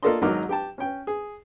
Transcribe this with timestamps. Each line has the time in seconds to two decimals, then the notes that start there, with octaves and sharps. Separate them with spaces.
0.03 A#3 F4 A4 D5 D#5 C6
0.22 G#1 F#3 D#4 A#4 D6 F6
0.49 G4 G5 A5
0.78 C#4 G5
1.07 G#4